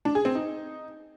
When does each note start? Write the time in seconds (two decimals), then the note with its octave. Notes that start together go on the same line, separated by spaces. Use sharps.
0.05 D4
0.15 G#4
0.25 C4
0.35 D#4